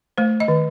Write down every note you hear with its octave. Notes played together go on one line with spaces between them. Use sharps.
A3 C5
D#5
D#3